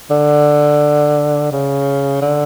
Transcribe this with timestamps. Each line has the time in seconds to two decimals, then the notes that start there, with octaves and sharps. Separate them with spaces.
0.10 D3
1.52 C#3
2.22 D3